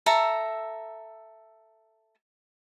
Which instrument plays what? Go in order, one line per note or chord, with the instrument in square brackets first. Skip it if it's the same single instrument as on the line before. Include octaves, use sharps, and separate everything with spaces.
[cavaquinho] A4 E5 A#5